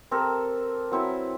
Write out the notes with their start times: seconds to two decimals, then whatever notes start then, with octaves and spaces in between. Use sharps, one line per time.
0.11 C4 G4 A4 A#4
0.92 F#3 C4 E4 B4